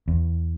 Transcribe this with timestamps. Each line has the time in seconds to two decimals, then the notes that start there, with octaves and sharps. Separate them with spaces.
0.08 E2